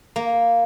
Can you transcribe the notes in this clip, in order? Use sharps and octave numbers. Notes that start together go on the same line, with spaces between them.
A#3